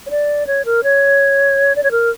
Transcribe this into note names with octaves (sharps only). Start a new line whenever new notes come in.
C#5
D5
C#5
A#4
C#5
D5
C#5
A#4